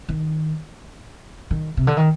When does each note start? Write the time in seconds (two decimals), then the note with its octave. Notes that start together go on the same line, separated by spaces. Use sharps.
0.09 D#3
1.51 D#3
1.77 C3
1.87 D3
1.97 D#3